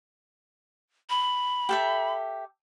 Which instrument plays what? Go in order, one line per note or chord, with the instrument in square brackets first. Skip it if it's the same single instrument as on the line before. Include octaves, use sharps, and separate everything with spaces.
[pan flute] B5
[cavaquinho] G4 A4 E5